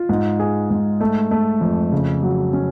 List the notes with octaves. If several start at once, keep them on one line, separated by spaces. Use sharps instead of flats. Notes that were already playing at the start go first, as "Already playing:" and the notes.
Already playing: F4
G#2
G#4
G#2
A3
A3
F2
C#3
F#3
C#4